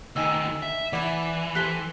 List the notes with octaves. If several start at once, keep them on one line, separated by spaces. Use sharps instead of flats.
D2 D#3 D#4 G#5 E6
E5
E3 E4 D5 F#5
G4 A4 C5 F#6 B6 G7